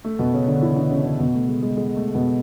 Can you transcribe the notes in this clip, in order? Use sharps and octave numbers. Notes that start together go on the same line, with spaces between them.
A3
B2 B3
C#3 C#4
D3 D4
E3 E4
D3 D4
C#3 C#4
C#3 C#4
B2 B3
A3
G#3
G#3
G#3
A3
B2 B3